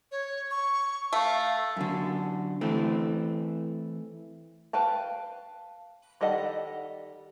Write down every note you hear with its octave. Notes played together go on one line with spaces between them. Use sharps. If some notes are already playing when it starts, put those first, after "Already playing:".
C#5
C#6
A3 F5
F#2 D3
E3 A3 C4
B4 F5 G5 A5
D#3 G3 A4 D#5 F#5